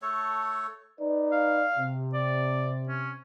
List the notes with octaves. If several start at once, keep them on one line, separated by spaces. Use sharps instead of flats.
A3 A4 C#5
D#4 B4 D5
F5
C3
D5
C#4